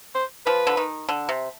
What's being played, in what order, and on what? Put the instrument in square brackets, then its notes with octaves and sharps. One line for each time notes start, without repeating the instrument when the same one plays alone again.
[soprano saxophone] C5
[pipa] F3 [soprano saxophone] B4
[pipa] D3
D#3
D3
C3